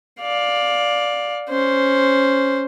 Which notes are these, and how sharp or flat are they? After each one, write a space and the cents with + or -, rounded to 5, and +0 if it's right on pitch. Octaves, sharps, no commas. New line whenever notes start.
D5 +0 F5 +15
C#4 +0 C5 +0